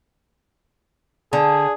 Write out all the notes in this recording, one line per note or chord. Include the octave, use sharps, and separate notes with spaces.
D3 G#4